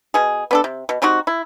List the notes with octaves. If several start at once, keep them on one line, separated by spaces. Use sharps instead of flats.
B2 G#4
B3 D4 A4
C3
B2
G3 C4 D#4 F#4
E4